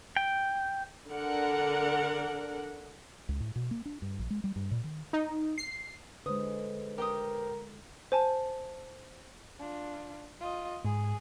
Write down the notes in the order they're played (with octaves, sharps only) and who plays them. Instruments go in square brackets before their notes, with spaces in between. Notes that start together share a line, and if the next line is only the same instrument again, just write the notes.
[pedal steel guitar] G5
[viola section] D3 D4 A#4 F#5
[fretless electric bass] C#2
A2
B2
A#3
D4
G2
A#1
G#3
G3
G2
A#2
D#3
[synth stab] D#4
C7
[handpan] D3 G#3 [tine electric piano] B4 C5 [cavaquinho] D#6
[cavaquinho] G4 G5 D#6 [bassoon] A#4
[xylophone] C5 G#5 A5
[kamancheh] D4 F4
F4 D#5
[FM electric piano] G#2 [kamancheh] G#4